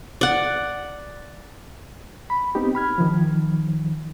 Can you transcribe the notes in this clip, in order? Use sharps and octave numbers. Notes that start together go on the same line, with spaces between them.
D5 F#5
B5
B3 C4 D#4 G4
B5 F6 G#6
D#3 F3